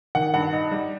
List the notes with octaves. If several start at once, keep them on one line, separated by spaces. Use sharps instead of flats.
D#3 F#5
G2 F#5
D#4
G3